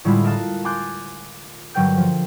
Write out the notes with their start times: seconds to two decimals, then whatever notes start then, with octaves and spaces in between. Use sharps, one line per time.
0.05 A2 D3 G3 G#3 E4 F4
0.24 A#4 D#5 F5 A5 F#6
0.64 G#5 C6 D6 F#6 G6 A6
1.74 G2 D3 F#3 A#4 G5 G6
1.97 F3